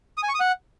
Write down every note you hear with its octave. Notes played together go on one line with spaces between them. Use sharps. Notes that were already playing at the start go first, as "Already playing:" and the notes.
D#6
G#5
C#6
D#6
F#5